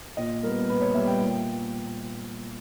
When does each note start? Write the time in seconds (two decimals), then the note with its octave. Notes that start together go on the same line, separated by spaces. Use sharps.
0.17 A#2 D#5
0.43 G3 B3 A#4
0.69 A#2 B4
0.81 C#5
0.94 G3 B3 E5
1.07 G5
1.19 A#2 G5